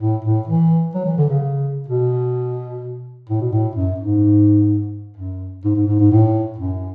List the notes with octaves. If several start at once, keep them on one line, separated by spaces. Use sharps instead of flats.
A2
A2
E3
F#3
E3
D3
C#3
B2
A2
B2
A2
F#2
G#2
F#2
G#2
G#2
G#2
G#2
A2
F#2